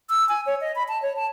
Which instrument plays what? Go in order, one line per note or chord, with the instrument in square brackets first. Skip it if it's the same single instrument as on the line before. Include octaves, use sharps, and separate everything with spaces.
[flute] E6
G#5
C#5
D#5
B5
A5
C#5
A5